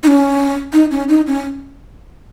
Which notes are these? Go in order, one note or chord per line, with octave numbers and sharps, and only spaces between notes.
D#4
C#4
D#4
C#4
D#4
C#4